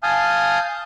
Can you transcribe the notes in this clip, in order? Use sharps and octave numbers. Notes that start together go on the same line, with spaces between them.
F5 G#5 A5 D#6 F6 G6